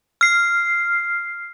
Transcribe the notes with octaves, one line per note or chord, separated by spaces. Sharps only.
F6 C7